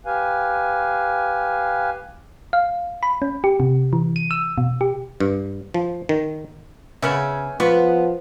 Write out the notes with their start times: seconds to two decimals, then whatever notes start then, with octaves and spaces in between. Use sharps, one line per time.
0.06 G4 B4 F5 G#5
2.53 F5
3.03 B5
3.22 C#4
3.44 G4
3.60 C3
3.93 E3
4.16 D#7
4.31 E6
4.58 B2
4.81 G4
5.20 G2
5.74 F3
6.09 D#3
7.02 C#3 B3 C#4 E5
7.60 F3 B3 F4 C#6